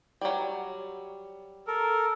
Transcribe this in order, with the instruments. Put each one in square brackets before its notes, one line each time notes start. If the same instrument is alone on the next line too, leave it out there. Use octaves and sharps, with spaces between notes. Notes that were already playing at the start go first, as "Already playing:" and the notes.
[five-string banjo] F#3 G3
[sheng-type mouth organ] A4 A#4